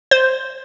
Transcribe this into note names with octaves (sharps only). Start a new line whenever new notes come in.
C5